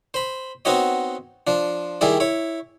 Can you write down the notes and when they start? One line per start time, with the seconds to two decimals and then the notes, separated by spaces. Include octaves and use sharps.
0.14 C5 B5
0.65 B3 C4 D#4 F#4 C#5 D#5
1.47 F3 D4
2.01 D#3 G3 E4 G#4 D5
2.20 E4 C#5